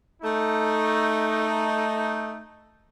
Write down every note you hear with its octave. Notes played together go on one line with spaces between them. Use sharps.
A3 D#4